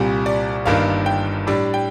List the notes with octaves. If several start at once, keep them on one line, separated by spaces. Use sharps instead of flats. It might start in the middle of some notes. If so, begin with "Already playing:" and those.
Already playing: C2 A#2 G3
D5
G1 G2 D#3 A#3 D4 F5
G5
A2 G3 D4 D5
G5